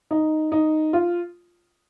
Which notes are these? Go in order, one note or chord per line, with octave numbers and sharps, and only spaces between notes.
D#4
D#4
F4